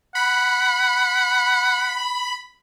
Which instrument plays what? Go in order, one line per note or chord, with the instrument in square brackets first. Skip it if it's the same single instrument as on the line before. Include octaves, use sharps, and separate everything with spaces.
[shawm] F#5 [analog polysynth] B5